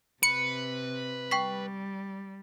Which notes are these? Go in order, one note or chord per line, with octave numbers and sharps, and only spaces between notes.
C3 B4 C#7
G3 G5 C#6 B6